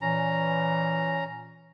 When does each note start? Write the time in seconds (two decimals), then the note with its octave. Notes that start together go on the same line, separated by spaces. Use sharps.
0.01 A#2 E3 C#4 A#5